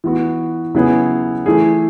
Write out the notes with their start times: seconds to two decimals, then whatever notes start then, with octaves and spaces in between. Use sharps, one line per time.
0.04 E3 B3 F#4
0.75 C#3 F#3 B3 E4 G#4
1.46 E3 A3 E4 G#4